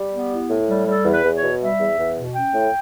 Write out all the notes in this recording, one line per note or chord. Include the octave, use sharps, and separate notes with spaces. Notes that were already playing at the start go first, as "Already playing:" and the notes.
Already playing: G3 G4
B3
E4
A2
G3
G3 A4
E2
B4
E2
C#5
B2
G3 E5
E2
E2
B2
C#4 G5
A2